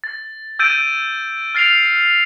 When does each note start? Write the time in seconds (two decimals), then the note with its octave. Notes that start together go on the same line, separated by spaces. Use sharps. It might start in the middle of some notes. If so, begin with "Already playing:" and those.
0.04 A6
0.59 E6 G6 A6 D7 D#7
1.55 F6 A6 C7 D7 F7